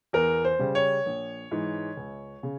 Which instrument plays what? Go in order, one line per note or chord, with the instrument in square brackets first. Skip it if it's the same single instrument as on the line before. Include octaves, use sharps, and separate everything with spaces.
[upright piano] E2 A#4
C5
C#3 G3
C#5
A#1
G#2 E3
C#2
C#3